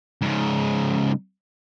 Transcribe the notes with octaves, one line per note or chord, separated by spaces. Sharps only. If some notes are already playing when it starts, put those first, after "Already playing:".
G#2 C#3